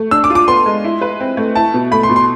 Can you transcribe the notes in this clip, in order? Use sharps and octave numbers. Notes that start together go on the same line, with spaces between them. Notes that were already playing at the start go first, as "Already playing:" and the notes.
Already playing: A3
D4 E6
D6
F4
D6
B3 C6
G#3
E4
B4
C4
A3
E4 A5
B2
A3 B5
C6
B2
C6